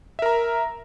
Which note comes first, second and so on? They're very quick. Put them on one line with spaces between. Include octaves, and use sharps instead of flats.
E5 A#4 A#5